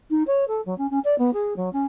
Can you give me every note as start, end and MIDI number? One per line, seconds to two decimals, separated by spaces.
0.10 0.23 63
0.27 0.47 73
0.48 0.61 69
0.66 0.77 54
0.78 0.87 61
0.91 1.00 61
1.05 1.15 74
1.18 1.31 59
1.33 1.54 68
1.57 1.72 54
1.73 1.86 61